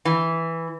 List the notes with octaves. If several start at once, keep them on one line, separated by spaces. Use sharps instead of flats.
E3